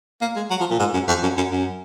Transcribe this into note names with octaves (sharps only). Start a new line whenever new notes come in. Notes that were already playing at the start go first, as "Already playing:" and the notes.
A#3
G#3
F#3
F3
A#2
G#2
F#2
F2
F#2
F#2
F#2